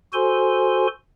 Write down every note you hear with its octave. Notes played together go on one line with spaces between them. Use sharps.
F#4 A4 C5 G#5 C6